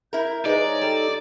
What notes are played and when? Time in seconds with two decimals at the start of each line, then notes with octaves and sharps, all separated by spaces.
0.13 E4 A#4 E5 G6
0.46 G#3 D#4 B4 C5 D5 A#5
0.60 C#5 A#5
0.81 G3 A4 A#5